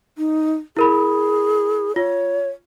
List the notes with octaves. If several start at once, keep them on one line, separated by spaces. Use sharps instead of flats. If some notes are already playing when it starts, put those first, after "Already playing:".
D#4
E4 G#4 A#4 B5
F4 C#5